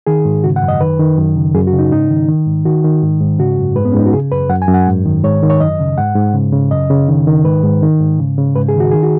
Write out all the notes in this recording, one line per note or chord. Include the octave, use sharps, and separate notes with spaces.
D#3 G#4
G#2
C#3 F#4
F#5
F#2
D#5
D#3 B4
D#3
F#2
C#3
F#2 G#4
F#4
C#3
D#4
G#2 D#4
D#3
D#3
G#2
D#3 F#4
D#3
G#2
G#2
C#3 F#4
F#2
G#2 B4
B3
C#4
G#2 D#4
F#4
C#3 G#4
F#2 B4
F#2 F#5
G#5
F#2
F#5
G#2
D#3
G#2 C#5
D#3
C#5
F#2 D#5
C#3
G#2 F#5
G#2
C#3
C#3
F#2 D#5
C#3
D#3
D#3
G#2 B4
G#2
D#3
G#2
C#3
C#3
G#2 B4
G#4
D#3
F#4
D#3 G#4
F#4